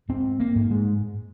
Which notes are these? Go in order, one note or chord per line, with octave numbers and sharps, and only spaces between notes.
G#2 C4
A#3
G#2
G#3